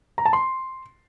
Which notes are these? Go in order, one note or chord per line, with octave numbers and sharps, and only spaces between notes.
A#5
A5
C6